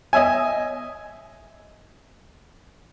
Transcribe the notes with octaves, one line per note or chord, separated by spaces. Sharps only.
D#5 E5 G#5